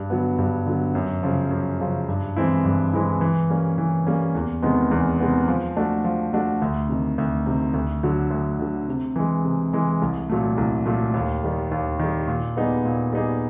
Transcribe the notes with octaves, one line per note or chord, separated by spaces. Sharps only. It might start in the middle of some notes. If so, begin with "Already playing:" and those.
Already playing: G2
D3 F#3 B3
G2
D3 F#3 B3
F#2
C#3 F3
F#2
C#3 F3
G2
E3 G#3 C4 E4
G2
E3 G#3 C4 E4
E3
G3 A#3 C#4
E3
G3 A#3 C#4
E2
C3 D#3 G#3 B3
E2
C3 D#3 G#3 B3
F3
A3 D4 F#4
F3
A3 D4 F#4
D2
C3 D#3
D2
C3 D#3
D2
D3 F#3
D2
D3 F#3
C3
E3 G#3
C3
E3 G#3
C2
A#2 F#3 A3
C2
A#2 F#3 A3
D#2
D#3 G3
D#2
D#3 G3
A#2
G3 B3 D#4 G#4
A#2
G3 B3 D#4 G#4